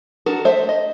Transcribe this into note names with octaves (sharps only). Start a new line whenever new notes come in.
D4 F#4 A4 A#4
A3 C5 E5
D#5